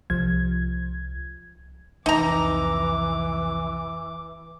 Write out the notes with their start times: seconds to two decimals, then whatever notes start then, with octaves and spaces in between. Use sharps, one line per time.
0.10 C2 F3 G#6
2.06 C2 F2 E3 D#4 A#5 D6